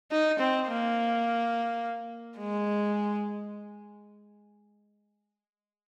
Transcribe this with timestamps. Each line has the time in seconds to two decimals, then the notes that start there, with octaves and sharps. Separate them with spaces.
0.11 D#4
0.39 C4
0.67 A#3
2.38 G#3